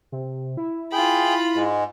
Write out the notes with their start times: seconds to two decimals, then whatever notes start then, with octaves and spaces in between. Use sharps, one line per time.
0.12 C3
0.57 E4
0.93 F4 G#4 G5 B5
1.56 G#2 G#3